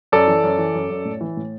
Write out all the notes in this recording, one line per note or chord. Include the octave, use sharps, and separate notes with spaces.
F#2 A4 D5
E3
F#2
E3
F#2
F#2
A2
E3
A2